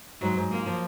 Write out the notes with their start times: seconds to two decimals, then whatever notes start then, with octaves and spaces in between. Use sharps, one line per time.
0.21 G#2 F#3
0.37 G#2
0.51 A#3 F4
0.66 F3